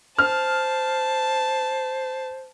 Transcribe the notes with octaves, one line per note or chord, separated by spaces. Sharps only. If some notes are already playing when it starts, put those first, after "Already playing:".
C5 A5 F6